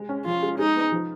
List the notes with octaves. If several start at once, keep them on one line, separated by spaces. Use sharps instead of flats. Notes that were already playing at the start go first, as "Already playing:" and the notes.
Already playing: G#3
C#4
F3 F4
G#3
G#3 D#4
B3
F3